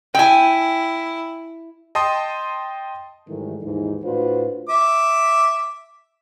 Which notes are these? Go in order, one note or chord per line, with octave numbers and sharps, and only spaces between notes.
E4 G5 G#5
D#5 G5 A5 C6 D#6
G#2 D#3 E3 G3 A3
D#2 G#2 E3 D#4
A2 D4 F4 F#4 B4 C5
E5 D6